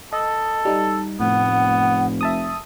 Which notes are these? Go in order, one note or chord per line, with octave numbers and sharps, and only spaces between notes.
A4 D#5
G3 D#4
F1 A2 B3 F#5
E5 A5 D#6